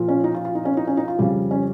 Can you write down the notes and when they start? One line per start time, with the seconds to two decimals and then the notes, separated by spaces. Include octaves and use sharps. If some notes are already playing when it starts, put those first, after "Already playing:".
Already playing: A#2 F3
0.08 C#4
0.24 D#4
0.34 F4
0.45 F4
0.55 D#4
0.65 C#4
0.77 D#4
0.87 C#4
0.97 D#4
1.08 F4
1.19 F2 C#3 G3
1.51 C#4